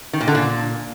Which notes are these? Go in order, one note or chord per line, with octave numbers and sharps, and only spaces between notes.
D#3
A#2
D3
A#2